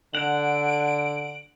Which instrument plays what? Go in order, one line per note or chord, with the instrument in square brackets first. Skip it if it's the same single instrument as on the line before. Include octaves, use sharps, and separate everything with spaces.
[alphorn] D3 [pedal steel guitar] F#5 [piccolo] D7